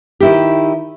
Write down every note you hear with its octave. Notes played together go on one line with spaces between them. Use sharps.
D#3 E4 G4